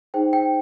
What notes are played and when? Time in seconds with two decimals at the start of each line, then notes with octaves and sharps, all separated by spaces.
0.14 D#4 G#4 C5 G5
0.33 G5